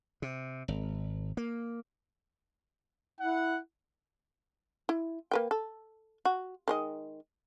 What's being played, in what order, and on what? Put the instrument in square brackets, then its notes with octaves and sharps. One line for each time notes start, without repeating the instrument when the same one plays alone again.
[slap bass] C3
G#1
A#3
[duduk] E4 [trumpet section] F#5
[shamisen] E4
A#3 B4 G5
A4
F#4
D#3 G#3 D#5